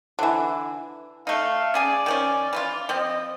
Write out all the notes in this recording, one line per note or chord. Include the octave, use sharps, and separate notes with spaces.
D3 E3
A3 D#4 F5
C#4 G#4 D5 G#5
D#3 F3 C#4
E3 C#4 F4
F3 C4 D#5